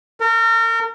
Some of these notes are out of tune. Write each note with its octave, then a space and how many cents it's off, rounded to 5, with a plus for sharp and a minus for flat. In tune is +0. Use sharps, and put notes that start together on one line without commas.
A#4 -35